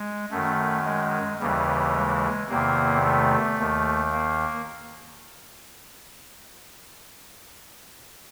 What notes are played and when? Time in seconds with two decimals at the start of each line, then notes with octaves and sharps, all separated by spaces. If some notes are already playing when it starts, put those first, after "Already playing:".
Already playing: G#3
0.30 F#2 D#3 A3
0.85 G#3
1.40 D#2 C#3 E3 G3
1.94 G#3
2.48 E2 C3 D#3 A#3
3.03 A3
3.58 D#2 D#3
4.12 A#3